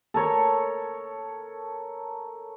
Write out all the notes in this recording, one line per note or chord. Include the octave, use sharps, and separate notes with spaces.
A4 A#4 C#5